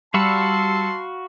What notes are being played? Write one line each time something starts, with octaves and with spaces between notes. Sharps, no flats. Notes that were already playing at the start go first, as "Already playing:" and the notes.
G3 F#4 F5 A5 B5 C6 E6 C#7